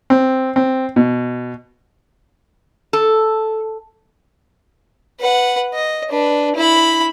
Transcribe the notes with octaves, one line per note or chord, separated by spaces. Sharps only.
C4
C4
B2
A4
B4 F#5
D#5
D4 B4
E4 B5